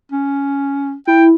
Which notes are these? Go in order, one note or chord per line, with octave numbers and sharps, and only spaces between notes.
C#4
E4 G5